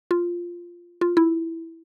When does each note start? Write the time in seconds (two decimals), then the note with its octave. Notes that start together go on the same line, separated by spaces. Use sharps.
0.11 F4
1.01 F4
1.17 E4